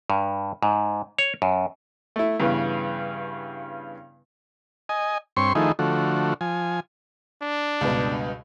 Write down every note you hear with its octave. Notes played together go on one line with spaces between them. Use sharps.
G2
G#2
C#5
F#2
A3 E4
G2 C#3 E3 B3
D#5 G#5
G2 C4 C#5 C6 C#6
D#3 F3 A3 D#4 E4 G#4
D3 F3 A3 F#4
F3 G#5
D4
C#2 G2 B2